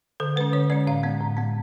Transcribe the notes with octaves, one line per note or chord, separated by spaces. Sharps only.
D3 A4
G#3 C#4 B4
D3 C#5
G#3 C#4 D5
A2 F5
G#3 B3
A2
G#3 B3